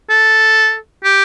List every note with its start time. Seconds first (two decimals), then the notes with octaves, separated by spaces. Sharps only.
0.10 A4
1.04 G4